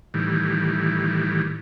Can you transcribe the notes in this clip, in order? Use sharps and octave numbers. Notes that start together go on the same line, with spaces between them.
A2 D#3 E3 G3